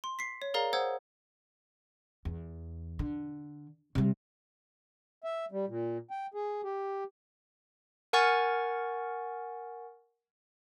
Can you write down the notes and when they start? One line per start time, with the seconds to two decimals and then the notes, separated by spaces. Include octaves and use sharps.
0.04 C6
0.19 B6 C7
0.42 C#5
0.54 G#4 A#4 D5 F5 A#5
0.73 C5 F#5 D#6 E6 G#6
2.25 E2
2.99 D3
3.95 C3 G3
5.24 E5
5.51 G3
5.68 A#2
6.11 G5
6.34 G#4
6.64 G4
8.13 A#4 F#5 G#5 C#6 F6 A6